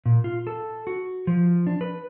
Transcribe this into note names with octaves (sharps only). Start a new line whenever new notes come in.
A#2
F4
A4
F#4
F3
D4
B4